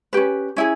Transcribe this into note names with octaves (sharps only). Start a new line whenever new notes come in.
C#4 G4 B4
C#4 E4 G#4